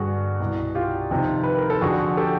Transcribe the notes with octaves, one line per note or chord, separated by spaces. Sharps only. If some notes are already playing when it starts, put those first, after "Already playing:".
Already playing: G2 D3 F#4 G#4
C2 B2
F4 G4
F2 C3 D#3
B4
A#4
A4
F2 D3 F#4 G#4
G4 A4